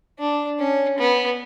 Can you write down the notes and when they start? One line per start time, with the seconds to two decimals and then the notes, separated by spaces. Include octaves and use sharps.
0.19 D4
0.59 C#4
0.99 B3